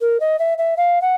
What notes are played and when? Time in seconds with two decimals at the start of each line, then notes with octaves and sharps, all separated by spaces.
0.01 A#4
0.20 D#5
0.39 E5
0.58 E5
0.77 F5
1.01 F#5